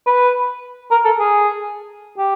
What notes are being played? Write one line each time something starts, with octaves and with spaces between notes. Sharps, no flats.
B4
A#4
A4
G#4
G4